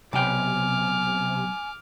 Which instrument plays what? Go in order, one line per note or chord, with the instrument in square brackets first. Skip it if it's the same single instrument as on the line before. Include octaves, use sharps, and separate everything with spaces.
[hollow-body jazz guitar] B1 G5 [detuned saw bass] C3 [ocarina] G#5 [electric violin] D6 F6